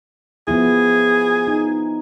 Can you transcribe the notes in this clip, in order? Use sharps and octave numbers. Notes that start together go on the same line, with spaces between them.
F3 B3 E4 G#4
D#4